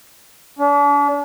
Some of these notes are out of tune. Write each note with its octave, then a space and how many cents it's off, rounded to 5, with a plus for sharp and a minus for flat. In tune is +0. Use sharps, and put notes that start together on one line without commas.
D4 -40